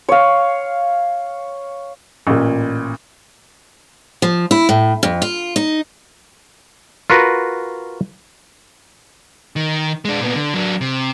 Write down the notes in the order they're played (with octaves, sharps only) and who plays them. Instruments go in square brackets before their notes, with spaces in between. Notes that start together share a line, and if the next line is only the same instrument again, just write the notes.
[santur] C#5 F5
[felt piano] A1 A#2
[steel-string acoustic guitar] F3
E4
A2
F2
F4
D#4
[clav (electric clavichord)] F4 F#4 A#4 B4
[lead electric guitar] D#3
G#3 D4
A#2 B3
D3
F#3 D4
C3